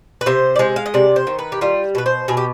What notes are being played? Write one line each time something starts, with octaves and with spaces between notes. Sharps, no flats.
B4
C3 C5
D5
G#3 C5
F5
D#5
C3 D5
C5
D#3
B4
G4
G3 F4
B2 B4
C5
B2 G#4
G4